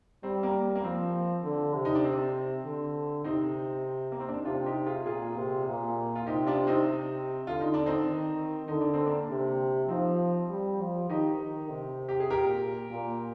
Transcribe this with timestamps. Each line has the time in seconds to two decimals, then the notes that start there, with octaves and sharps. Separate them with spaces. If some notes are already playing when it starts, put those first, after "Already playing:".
0.23 G3 C4
0.43 A#3
0.75 A#3
0.84 F3 C4
1.44 D3
1.74 C3
1.85 D#4
1.95 D4
2.04 C4
2.65 D3
3.24 C3 C4 D#4
4.12 A#3
4.20 C4
4.28 D4
4.37 D#4
4.45 C3 D4 F4
4.66 D#4 G4
4.86 F4 G#4
5.06 A#2 F4 G#4
5.36 C3
5.67 A#2
6.15 F4
6.27 C3 D#4 G4
6.46 D4 F4
6.67 C4 D#4
6.87 C3
7.47 D3 F4
7.61 D#4
7.74 D4
7.86 C4 D#4
8.08 D#3
8.68 D3 D#4
8.81 D4
8.94 C4
9.06 A#3 D4
9.29 C3
9.88 F3 C4 D#4
10.49 G3
10.80 F3
11.10 D#3 D#4 G4
11.40 D#3
11.70 C3
12.09 G4
12.20 G#4
12.30 A#2 G4 A#4
12.90 A#2